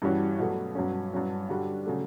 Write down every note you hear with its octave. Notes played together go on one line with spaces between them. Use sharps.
G2 E3 G3 C#4 F#4
B2 F#3 A3
G2 F#3 C#4
G2 F#3 C#4 F#4
D3 G3 D4 F#4
C#3 F#3 A3